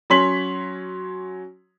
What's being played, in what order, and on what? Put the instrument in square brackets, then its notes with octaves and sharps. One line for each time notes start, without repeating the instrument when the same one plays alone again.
[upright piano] F#3 C#4 C#5 C6 B6 F#7